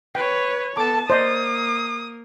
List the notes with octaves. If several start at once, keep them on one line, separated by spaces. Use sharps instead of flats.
B4 C#5 G5
B3 A4 A5 D6
A#3 C5 D5 D#5 D#6